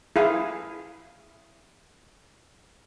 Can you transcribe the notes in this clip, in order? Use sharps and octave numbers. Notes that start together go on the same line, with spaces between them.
E4 G#4 F5